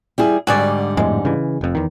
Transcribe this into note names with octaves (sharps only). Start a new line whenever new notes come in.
G3 E4 G#4
G#2 D3 G3 F#4 G#4 D5
F2 A2 G#3
C#3 E3
F1 F2
E2 D#3